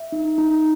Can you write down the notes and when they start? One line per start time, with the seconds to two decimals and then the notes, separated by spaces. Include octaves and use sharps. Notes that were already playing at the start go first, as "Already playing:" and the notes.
Already playing: E5
0.12 D#4
0.38 D#4